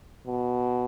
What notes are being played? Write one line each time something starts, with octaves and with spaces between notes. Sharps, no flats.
B2